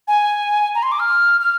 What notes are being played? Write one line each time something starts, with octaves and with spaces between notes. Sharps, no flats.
G#5
A#5
C6
D6
F6
F6